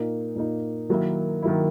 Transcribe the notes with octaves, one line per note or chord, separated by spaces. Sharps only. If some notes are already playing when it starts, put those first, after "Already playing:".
Already playing: A#2 A#3 D#4
A#2 A#3 D#4
D#3 F#3 A#3 E4
D#3 F#3 A#3 E4